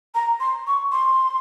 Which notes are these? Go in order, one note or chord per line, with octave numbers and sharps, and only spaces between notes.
A#5
C6
C#6
C6